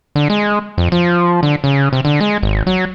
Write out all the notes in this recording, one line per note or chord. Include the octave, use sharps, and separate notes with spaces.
D3
G#3
F2
F3
D3
C#3
C3
D3
G#3
G#1
F#3